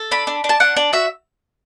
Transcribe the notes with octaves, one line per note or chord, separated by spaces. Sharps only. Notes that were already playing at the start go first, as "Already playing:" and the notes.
Already playing: A4
D4 B5
D4
D4
A5
D4 F#5
D4 D5
F#4 E5